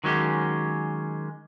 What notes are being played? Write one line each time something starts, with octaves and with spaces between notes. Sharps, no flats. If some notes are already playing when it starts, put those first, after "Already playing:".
D#3 F#3 G#3 C#4 G4